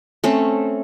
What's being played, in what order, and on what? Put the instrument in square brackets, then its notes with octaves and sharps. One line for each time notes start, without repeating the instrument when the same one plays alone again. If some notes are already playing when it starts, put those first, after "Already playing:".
[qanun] A3 C4 C#4